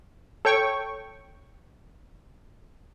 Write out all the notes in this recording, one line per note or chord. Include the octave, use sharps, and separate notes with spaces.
A4 C#5 G5 C#6